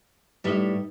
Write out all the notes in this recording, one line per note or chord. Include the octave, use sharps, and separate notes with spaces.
A2 G3 D#4 B4 E5